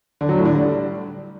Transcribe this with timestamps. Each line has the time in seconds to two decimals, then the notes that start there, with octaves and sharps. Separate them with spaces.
0.21 D3
0.29 F#3
0.37 A2
0.45 D3
0.54 G3